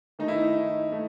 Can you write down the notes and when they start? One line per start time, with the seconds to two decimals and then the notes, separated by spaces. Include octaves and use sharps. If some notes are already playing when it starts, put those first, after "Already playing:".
0.19 D#3 A3 D#4
0.28 E4
0.38 D#4
0.92 A3